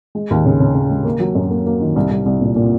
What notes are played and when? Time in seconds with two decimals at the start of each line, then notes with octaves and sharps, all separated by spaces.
0.15 G#3
0.31 D#2
0.46 C#3
0.60 C#3
0.75 C#3
0.91 G#3
1.05 A#3
1.20 F#3
1.35 F#2
1.50 A#3
1.66 A#3
1.81 D#3
1.96 C2
2.11 C2
2.26 C2
2.41 A#2
2.56 A#2